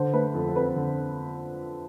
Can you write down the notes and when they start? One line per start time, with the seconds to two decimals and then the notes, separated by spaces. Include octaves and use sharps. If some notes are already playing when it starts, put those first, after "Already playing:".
Already playing: D3 C5
0.14 A3 B4
0.34 F2 A4
0.48 A4
0.56 C4 B4
0.76 D3